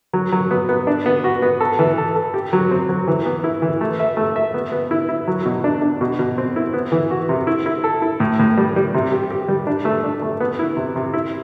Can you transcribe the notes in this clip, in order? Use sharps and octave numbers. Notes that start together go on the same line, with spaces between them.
F#3
F#3
B3
B3
D4
B3
F#4
B3
A4
E3
A4
A4
G4
F#3
C4
F#3
E3
B3
E4
E3
A3
E5
A3
E5
B3
B3
E4
E4
F#3
B2
D4
D4
B2
B2
C4
E4
B3
E3
F#4
C3
E4
E4
A4
E4
A2
A2
G3
G3
C3
G4
G4
G3
D4
A3
D4
A3
B3
E4
C3
C3
E4